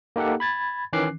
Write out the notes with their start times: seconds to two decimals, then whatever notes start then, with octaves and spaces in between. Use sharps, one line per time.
0.16 A#3 D#4 G4 A4 F#5
0.40 B5 G#6 A6
0.93 D#3 E3 C#4 D6 F#6 C7